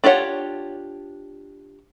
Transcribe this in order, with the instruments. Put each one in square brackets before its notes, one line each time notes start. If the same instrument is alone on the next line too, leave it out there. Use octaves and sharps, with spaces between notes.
[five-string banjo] D4 F4 G4 C#5 F#5